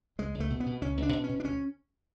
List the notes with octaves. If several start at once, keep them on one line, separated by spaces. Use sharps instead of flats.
C#2 G#3
C#2
A3
B2
B3
B2
C#2 C#4
C#2
D4
B2
C#4
B2
D4
D2 C#4